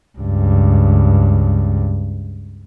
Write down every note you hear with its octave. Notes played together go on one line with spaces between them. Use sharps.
C#2 G2